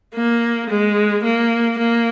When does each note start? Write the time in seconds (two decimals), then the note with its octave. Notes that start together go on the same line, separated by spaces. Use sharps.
0.15 A#3
0.70 G#3
1.24 A#3
1.79 A#3